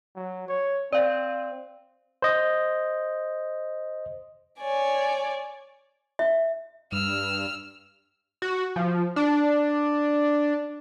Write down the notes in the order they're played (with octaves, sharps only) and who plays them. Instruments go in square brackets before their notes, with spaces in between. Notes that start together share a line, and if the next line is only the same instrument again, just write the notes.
[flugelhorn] F#3
C#5
[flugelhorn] C4 [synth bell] D5 F5
[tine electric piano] C5 D#5
[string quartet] C#5 D5 G#5
[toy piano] E5
[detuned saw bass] G2 [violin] E6 F6
[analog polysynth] F#4
F3
D4